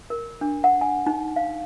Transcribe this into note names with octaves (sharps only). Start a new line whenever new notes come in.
A#4
D4
F#5
G#5
D#4
F5